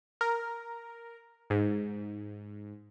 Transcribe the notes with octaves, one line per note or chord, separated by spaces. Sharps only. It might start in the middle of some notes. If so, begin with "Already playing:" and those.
A#4
G#2